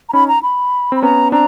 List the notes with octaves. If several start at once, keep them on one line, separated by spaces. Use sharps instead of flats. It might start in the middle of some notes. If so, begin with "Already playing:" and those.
A#5
C#4 D#4 B5
A#5
B5
C4 B5
B3 C#4 A#5
C4 D4 A#5